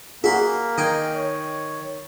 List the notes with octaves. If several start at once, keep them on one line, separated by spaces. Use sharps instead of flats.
A#3 F#4 G#4 E5 B5 C6
D#3 D#5 G5 G#5
C#5